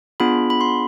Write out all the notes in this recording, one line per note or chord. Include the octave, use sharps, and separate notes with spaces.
B3 D4 F4 G#4 B5
B5
C6